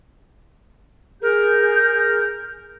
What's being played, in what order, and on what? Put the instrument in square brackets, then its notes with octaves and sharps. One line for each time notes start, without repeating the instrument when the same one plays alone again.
[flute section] G#4 G6 [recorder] A#4